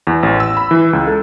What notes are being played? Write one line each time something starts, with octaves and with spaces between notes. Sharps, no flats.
E2
A1
E6
B5
E3
C#2
A4